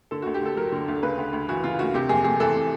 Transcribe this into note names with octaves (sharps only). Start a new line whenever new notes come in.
D3 A4
D2 F#4
G4
D2 A4
F#3 A#4
D3
D2
C#3 B4
D2
D2
E3 F#4
C#3 F4
D2 F#4
C3 G4
F2 G#4
F2 G#4
E3 A4
C3